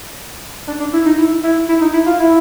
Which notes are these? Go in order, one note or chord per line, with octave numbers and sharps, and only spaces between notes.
D4
D4
E4
D#4
E4
E4
E4
D#4
E4
F4
E4